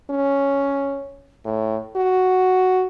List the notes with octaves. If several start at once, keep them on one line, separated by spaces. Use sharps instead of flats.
C#4
A2
F#4